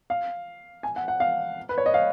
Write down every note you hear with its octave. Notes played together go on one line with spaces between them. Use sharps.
F5
G#5
F#5
F#5
F5
B4
C#5
D#5
F5